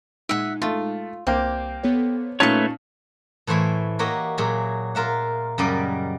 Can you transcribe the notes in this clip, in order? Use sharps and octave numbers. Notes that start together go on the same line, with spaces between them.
A#2 G#3 D#4 E5 F#5
A3 F4
C2 A#3 C4 G4
B3 A4 C#5
A#2 A3 C#4 D#4 B4 C#5 A5 C#6
A2 E3 C5 C#5 E5 B5
A#3 F#4 G4 C#5 D#5 E5
A#2 F#3 G#4 E5
F4 A#4 E5 F#5
F#2 C#3 G3 D5 D#5 G#5